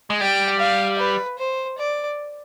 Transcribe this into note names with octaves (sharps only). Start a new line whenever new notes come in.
G#3
G3 G5
F5
B4
C5
D5